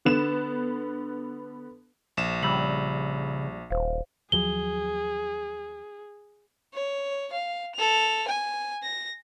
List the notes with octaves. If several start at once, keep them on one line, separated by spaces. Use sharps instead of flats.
D3 B3 E7
A#1 E7
C#3 G3 B5 E6 F#7
D#1 C5 F5
D#2 F3 F#3 G#4 G7
C#5
F5
A4 F7
G#5
A#6